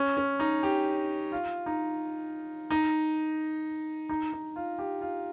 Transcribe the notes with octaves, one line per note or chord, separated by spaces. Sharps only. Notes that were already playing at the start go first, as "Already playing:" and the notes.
Already playing: C#4
C#4
D#4
G4
F4
D#4
D#4
D#4
D#4
F4
G4
F4